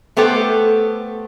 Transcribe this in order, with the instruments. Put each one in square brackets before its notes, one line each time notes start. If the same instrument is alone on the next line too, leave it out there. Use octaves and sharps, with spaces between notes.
[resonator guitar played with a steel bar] A3 B3 G4 A4 C5